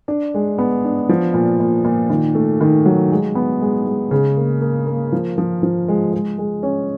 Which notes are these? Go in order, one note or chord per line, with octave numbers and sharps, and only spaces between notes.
D4
G#3
B3
D4
F3
A#2
A#2
A#2
D#3
A3
D#3
F#3
G#3
B3
G#3
G#3
C#3
A#3
A#3
A#3
F3
F3
F3
G#3
G#3
G#3
C#4